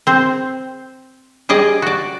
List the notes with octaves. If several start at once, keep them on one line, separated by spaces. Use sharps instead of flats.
C4 C5
G3 G#4 D5 D#5
F#4 D5